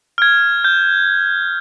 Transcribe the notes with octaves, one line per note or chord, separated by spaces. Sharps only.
F6 G#6
G6